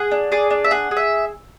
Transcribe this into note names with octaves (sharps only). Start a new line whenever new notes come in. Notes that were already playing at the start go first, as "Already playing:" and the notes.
Already playing: G#4 F#5
D4
G#4 D5
D4
E5
G#4 F#5
G#4
E5